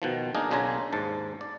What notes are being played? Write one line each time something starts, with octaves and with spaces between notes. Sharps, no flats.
B2 D#3 F3
A#3 D4 D#4 G#4 A#4
B1 C#3 D4 F4 G#5 A#5
D#2 G#2 A5
D5